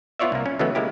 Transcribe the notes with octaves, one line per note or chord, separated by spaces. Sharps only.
B3 E4 F4 C#5 D5 E5
C2 A#3
C#4
C#3 E3 F#3 G#3 A3 B3
G#3 A#3 E4 G4